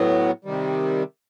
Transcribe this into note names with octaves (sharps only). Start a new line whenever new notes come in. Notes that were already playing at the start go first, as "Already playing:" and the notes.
Already playing: A2 F#3 B3
C3 D#3 G3